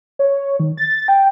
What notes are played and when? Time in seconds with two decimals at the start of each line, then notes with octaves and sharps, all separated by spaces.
0.19 C#5
0.60 D#3
0.77 A6
1.08 G5